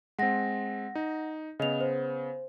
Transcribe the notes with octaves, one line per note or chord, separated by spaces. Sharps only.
G#3 C4 F#5 A#6
D#4
C#3 B3 D#5 F7
C5